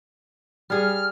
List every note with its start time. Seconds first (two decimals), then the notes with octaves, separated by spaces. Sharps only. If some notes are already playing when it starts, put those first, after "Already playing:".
0.70 G3 G#4 F6